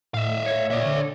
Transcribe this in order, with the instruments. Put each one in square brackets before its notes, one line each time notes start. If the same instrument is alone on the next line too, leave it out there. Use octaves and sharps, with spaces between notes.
[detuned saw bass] A2 [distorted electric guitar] E5 F5
[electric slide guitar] C#5
[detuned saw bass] A#2 [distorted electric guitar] D5 E5
[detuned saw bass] D3